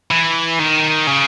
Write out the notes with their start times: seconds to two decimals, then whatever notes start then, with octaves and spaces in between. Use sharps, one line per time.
0.11 E3
0.59 D#3
1.07 C#3